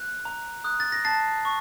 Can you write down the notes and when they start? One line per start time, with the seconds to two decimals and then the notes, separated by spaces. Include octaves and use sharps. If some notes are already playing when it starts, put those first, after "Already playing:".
Already playing: F#6
0.25 A#5
0.64 D#6 F#6
0.80 A6
0.92 A#6
1.04 A5 A6 C7
1.45 C#6